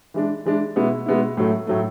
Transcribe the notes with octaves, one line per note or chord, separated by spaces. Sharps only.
E3 G#3 D4
E3 G#3 D4
B2 G#3 B3 E4
B2 G#3 B3 E4
A2 F#3 A3
A2 F#3 A3